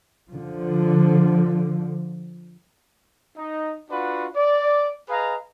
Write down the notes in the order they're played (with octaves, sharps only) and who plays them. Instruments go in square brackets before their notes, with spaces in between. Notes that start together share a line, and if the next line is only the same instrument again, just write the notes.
[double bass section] D3 F3
[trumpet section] D#4
D4 F4 F#4 B4 F#5
D5
G#4 B4 D#5 F5 A#5